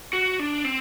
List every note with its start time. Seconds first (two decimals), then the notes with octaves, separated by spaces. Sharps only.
0.13 F#4
0.39 D4
0.65 C4